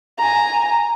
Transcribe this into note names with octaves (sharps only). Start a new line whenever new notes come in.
G#5 A#5